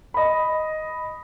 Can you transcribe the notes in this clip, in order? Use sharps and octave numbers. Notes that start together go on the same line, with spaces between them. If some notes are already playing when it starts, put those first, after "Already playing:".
D#5 B5